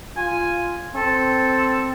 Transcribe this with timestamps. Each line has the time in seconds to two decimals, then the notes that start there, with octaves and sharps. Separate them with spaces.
0.17 F4 G#5
0.96 C4 A4